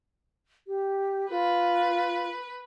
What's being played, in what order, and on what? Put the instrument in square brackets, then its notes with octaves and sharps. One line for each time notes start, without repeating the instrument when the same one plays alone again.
[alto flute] G4
[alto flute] F4 [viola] B4